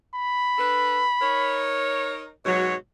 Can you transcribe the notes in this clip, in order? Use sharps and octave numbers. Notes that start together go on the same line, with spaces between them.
B5
D4 A4 B4
D#4 A#4 C#5
G#2 B2 F#3 C#5